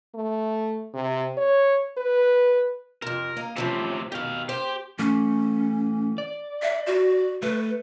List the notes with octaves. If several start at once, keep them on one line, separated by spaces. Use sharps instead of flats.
A3
C3
C#5
B4
F2 C3 A#4
A#3 D#5 F5
A2 C3 E3 F3 C#4
B2 D#3 G4 F5
G4 C5 G5
E3 A3 C#4
D5
E5
F#4
A3 B4